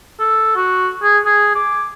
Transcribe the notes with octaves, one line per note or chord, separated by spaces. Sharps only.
A4
F#4
G#4
G#4
D6